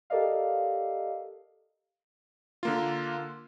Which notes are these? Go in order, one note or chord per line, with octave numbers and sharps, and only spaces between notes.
G4 A4 A#4 D5 D#5 F5
D3 A#3 F4